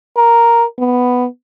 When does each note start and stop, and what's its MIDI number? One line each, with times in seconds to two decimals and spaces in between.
0.17 0.64 70
0.79 1.27 59